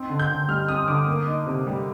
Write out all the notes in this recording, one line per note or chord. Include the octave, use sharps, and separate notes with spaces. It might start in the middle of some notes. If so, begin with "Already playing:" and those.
Already playing: C4 D#4
D3
G6
D3
G3 F6
C4 D#6
D3 D6
A#3
D#4
C3
G3